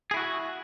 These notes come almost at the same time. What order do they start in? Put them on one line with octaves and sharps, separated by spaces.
G#4 E4 F#4